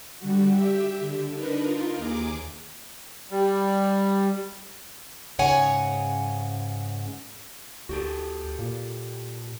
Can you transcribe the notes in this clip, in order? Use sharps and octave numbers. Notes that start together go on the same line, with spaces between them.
D3 G3 F#4
G4 E5
D3
D4 D#4 A#4 B4
D#4 F4 A#4
D#2 G#4 D6
G3
G#2 C#3 C#5 F#5 G#5
D2 F#4 G4 A4
A#2